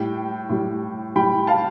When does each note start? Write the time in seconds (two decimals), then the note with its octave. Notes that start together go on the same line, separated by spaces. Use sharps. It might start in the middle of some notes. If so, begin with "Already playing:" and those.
Already playing: A2 G3 G5
0.49 A2 G3
1.15 A2 G3 G5 B5
1.47 F5 A5